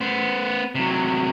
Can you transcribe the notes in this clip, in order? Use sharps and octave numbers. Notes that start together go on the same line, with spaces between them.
B3 C5
C3 F#3